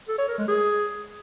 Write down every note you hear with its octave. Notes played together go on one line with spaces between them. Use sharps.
A4
C#5
A#4
G#3
G#4